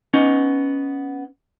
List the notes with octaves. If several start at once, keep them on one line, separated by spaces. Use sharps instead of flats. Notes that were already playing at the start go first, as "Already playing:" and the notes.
B3 C#4 D#4